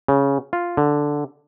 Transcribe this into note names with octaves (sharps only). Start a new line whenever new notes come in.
C#3
F4
D3